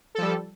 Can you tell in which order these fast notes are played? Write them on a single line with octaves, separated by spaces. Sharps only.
A4 F3 G3